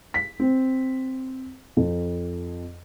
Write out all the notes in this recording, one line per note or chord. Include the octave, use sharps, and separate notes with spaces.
B6
C4
F2